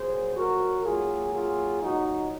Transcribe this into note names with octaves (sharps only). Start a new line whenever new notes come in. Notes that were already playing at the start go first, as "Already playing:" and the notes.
Already playing: A#2 F#3 A#3 G#4 C5
F#4 A#4
G#2 F#3 A#3 F4 G#4
F4 G#4
A#2 F#3 A#3 D#4 F#4